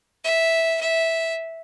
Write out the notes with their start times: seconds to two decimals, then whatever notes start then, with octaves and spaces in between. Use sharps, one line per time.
0.24 E5
0.81 E5